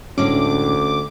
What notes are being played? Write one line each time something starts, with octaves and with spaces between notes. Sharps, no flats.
D2 A2 G#3 C#4 D4 D6